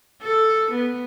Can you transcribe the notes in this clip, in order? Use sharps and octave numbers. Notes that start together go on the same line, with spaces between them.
A4
B3